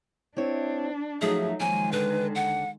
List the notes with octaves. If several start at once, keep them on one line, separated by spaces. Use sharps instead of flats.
C4 D4 E4 C#5
F3 F#3 A3 D#4 G#4 E5
D#3 F3 F#3 G#3 A#3 G#5
D#2 D3 B4
F#5